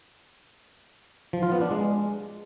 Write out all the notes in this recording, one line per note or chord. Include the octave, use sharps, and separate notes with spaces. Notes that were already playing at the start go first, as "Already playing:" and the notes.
F3
F4
B3
D4
G#3